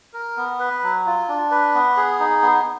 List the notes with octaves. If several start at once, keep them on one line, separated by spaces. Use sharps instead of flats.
A#4
B3
B4
F#3
F4
D4
B4
B3
G#4
D#4
B3